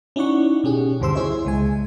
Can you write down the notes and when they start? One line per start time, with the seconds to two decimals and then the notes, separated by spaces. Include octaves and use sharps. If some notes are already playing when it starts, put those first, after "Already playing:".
0.16 C#4 D#4 E4 D5 F#5 C#6
0.64 B2 C#4 G4 G#4
1.00 D2 G2 G3 C5 C6 E6
1.15 E4 G#4 C5 C#5 D#5 E5
1.45 C#2 G#3 G#5